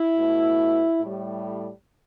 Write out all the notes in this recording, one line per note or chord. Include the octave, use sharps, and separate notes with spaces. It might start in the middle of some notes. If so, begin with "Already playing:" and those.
Already playing: E4
B2 A3
A2 G3